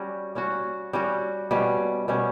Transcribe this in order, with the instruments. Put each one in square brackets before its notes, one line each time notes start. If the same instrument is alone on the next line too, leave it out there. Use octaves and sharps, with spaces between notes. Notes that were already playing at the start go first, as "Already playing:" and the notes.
Already playing: [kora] G3 C#4 F#4
G3 C#4 F#4
G3 C#4 F#4
B2 G3 C#4
B2 G3 C#4